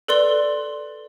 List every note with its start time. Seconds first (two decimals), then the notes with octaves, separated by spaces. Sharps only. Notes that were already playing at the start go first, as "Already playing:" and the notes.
0.08 A4 B4 D5 C6 G7